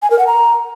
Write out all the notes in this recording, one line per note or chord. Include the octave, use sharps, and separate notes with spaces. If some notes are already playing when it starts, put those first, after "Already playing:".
G#5
A#4
F#5
A#5